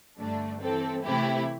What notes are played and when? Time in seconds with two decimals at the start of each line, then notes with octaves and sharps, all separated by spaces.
0.17 G2 D3 A3 D4
0.60 E3 C4 A4
1.04 C3 E3 A3 E4 G4